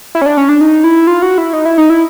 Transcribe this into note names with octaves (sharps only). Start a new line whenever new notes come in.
E4
C#4
D4
C#4
D4
D#4
E4
F4
F#4
E4
D#4
E4
D#4
E4